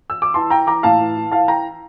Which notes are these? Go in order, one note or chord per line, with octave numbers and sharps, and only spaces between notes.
E6
D6
E3 A5 C6
E3 G5 A#5
E3 A#5 D6
A2 F5 A5
E3
E3
E3 F5 A5
E3 G5 A#5